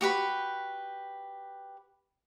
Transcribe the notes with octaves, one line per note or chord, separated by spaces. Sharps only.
F#4 G4 B4 B5